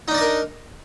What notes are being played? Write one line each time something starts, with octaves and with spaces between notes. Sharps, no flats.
D4 D#4 A#4 D5 D#5